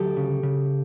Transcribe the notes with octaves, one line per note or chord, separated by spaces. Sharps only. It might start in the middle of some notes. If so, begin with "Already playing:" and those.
Already playing: D2 F#3 G4 A4
C#3
C#3